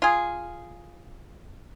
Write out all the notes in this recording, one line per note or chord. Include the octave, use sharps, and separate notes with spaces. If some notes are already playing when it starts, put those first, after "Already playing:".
F4 G#4